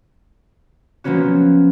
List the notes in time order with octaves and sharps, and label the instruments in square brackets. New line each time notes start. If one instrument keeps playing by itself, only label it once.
[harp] F3 F#3 A#3 B3 C#4 F#4